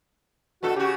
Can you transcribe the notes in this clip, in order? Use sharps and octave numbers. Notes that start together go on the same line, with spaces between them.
G2 B2 F#4 A4
C#3 F#4 G4